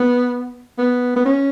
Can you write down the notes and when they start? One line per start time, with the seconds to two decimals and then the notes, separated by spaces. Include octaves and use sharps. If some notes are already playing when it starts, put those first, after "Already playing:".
Already playing: B3
0.78 B3
1.16 B3
1.26 C#4